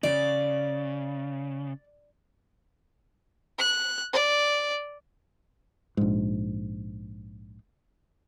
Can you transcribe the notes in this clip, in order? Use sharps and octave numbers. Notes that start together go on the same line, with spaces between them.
C#3 D5
F#6
D5
A#1 G#2